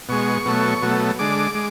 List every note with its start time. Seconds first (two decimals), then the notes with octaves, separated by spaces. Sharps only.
0.09 B2 G#3 C#6
0.46 B2 F#3 A3
0.82 B2 F#3 A3
1.19 D3 G#3 D6
1.55 G#3